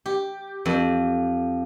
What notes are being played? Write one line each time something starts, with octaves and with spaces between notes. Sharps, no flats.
G4
F2